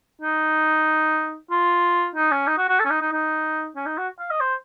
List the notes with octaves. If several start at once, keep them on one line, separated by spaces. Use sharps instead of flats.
D#4
F4
D#4
C#4
D#4
F#4
F#4
A4
C#4
D#4
D#4
D#4
C#4
D#4
F#4
F5
D#5
C5